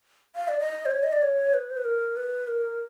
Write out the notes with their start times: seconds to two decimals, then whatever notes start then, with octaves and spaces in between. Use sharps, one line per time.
0.36 F5
0.48 D5
0.59 D#5
0.86 C5
0.91 C#5
1.03 D#5
1.12 D5
1.22 C#5
1.54 B4
1.70 C5
1.77 B4
1.84 A#4
2.16 B4
2.48 A#4